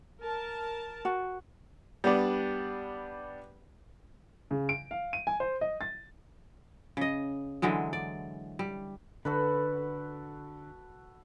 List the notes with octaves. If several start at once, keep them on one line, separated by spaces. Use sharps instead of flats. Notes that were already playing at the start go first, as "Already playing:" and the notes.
A#4 A5
F#4
G3 B3 D4
C#3
D7
F5
D#7
G#5
C5
D#5
A6
C#3 D#5
D3 E3 F#3 G#3
D5
G3
D3 F#4 A4 B4